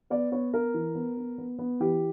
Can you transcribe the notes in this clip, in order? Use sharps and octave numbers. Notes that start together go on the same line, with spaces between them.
B3 D5
B3 C#5
B3 A#4
E3
B3
B3
B3
B3
E3 G4